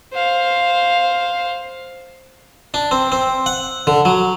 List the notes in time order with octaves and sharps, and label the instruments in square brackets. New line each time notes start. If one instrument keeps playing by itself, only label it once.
[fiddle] C5 F5
[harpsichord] D4
C4
C4
F#5
D3
F#3